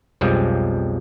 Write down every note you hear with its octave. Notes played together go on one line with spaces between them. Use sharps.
B1 F2 F3 G3 G#3